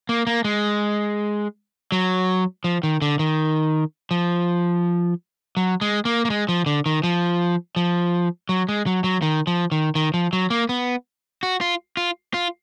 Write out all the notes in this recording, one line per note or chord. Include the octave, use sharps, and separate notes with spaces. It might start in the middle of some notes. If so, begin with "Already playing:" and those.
A#3
A#3
G#3
F#3
F3
D#3
D3
D#3
F3
F#3
G#3
A#3
A#3
G#3
F3
D3
D#3
F3
F3
F#3
G#3
F#3
F#3
D#3
F3
D#3
D#3
F3
F#3
A#3
B3
F#4
F4
F4
F4